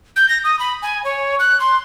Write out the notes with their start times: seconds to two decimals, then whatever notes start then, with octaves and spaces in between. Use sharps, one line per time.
0.16 G6
0.29 A#6
0.44 D#6
0.59 B5
0.82 G#5
1.04 C#5
1.39 F#6
1.60 C6